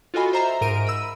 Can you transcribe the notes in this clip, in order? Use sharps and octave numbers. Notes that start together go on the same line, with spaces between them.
F4 F#4 A4 D#5 G#5 B5
C5 E5 A#5
G#2 A#4 D7 D#7
B5 E6